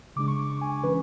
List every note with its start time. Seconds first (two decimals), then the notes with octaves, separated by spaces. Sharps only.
0.16 C#3 G#3 D4 D6
0.28 C#6
0.39 D6
0.50 C#6
0.61 G#5
0.72 G#5
0.83 E3 G#3 C#4 B4